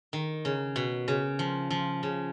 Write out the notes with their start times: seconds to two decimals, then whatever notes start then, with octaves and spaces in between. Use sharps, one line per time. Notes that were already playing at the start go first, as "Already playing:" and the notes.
0.13 D#3
0.45 C#3
0.76 B2
1.08 C#3
1.39 F3
1.70 F3
2.03 C#3